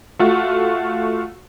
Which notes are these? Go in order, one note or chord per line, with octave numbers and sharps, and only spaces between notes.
A3 F4 F#4